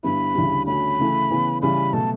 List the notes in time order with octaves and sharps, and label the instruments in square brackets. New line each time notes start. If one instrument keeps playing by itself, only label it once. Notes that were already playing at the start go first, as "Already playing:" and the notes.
[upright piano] G2 D3 G3 B3 E4 [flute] B5
[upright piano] D2 C#3 E3 G3
[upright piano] D3 A3 C#4 F#4 [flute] B5
[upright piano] C#3 E3 A3 E4
C#3 E3 B3
[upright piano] C#3 E3 G3 [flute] B5
[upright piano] B2 F#3 A3 [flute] A5